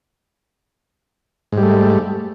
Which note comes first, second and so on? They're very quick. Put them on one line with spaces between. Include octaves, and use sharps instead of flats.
G#2 G3 A3